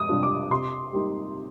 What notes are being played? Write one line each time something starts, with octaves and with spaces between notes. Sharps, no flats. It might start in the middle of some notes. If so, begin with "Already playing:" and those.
Already playing: F2 D#6
C3 G3 D4 F4
D6
C3 C6
G3 A#3 D#4